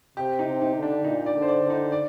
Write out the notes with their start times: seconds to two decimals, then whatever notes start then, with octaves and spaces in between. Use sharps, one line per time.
0.17 C3 G4
0.39 D#4
0.47 C3
0.61 D#4
0.76 D3
0.82 D4
1.04 A#2 D#4
1.26 D5
1.34 D3
1.42 C5
1.48 D5
1.63 D3
1.70 D#4
1.92 D5